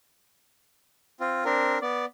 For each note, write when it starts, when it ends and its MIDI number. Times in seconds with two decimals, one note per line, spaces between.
1.20 1.44 60
1.20 1.44 65
1.45 1.78 60
1.45 1.78 62
1.45 1.78 70
1.82 2.05 59
1.82 2.05 74